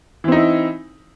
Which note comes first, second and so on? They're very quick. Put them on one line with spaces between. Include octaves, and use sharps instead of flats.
E3 C4 D#4 E4